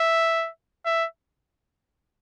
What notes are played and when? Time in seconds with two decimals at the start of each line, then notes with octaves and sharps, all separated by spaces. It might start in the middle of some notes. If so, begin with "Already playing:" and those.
Already playing: E5
0.85 E5